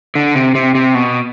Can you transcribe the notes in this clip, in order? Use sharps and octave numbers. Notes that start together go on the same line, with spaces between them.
D3
C3
C3
C3
B2